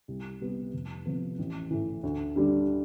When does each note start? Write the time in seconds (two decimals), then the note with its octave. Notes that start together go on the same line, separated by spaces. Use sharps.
0.08 C2
0.41 C3 G3 B3
0.73 F1
1.06 F2 C3 F3 B3
1.39 A1
1.71 A2 E3
2.03 D2
2.36 D3 G3 D4